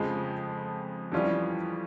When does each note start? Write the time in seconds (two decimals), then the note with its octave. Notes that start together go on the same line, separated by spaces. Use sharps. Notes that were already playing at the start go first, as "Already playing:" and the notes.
Already playing: F2 C#3 F3 G#3
1.12 F2 E3 G3 C#4 F4